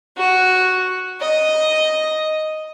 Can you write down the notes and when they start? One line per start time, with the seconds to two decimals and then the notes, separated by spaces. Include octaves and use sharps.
0.18 F#4
1.20 D#5